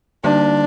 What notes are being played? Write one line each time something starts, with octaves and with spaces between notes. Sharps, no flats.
D3 G3 A#3 D4 D#4